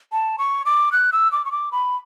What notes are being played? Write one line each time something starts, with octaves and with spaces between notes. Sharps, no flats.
A5
C#6
D6
F#6
E6
D6
C#6
D6
B5